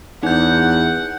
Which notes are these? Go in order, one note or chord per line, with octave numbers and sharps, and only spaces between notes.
E2 D#4 F#5 G6